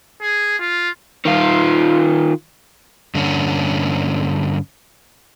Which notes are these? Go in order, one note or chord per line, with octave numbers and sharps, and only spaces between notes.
G#4
F4
D#3 F4
G2 D3 A#3 C#4